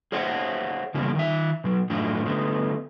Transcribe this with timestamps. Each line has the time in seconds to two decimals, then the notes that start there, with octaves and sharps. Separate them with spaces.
0.12 G#4 C5 C#5 E5 F#5
0.94 C#3 E3 G3 A#3 B3
1.15 D#3 E5
1.64 B2 F#3
1.90 F#2 A2 F3 A3 D4 E4
2.25 D3 A3 B3